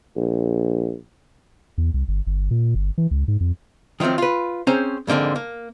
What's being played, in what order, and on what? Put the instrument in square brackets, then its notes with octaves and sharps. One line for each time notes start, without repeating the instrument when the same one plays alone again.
[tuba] A#1
[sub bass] E2
C2
G1
G1
A#2
G1
E3
C#2
G#2
F2
[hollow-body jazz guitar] D#3 F3 F#3 A3 C4
F4 B4
C4 C#4 G#4 C5 A#5
F2 G#2 D3 A#3 C4
A#3